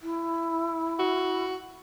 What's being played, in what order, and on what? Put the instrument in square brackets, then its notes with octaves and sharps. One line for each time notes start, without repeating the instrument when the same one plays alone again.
[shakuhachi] E4
[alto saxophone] F#4